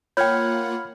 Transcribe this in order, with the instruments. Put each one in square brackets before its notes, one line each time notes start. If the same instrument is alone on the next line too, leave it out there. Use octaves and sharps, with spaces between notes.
[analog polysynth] A#3 F4 F#5 [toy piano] C#5 G5 [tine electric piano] B5 F6 G#6